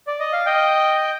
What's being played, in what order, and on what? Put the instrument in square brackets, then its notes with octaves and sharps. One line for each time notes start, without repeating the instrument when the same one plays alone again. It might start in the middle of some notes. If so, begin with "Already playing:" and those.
[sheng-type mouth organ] D5
D#5
F5
D#5 G5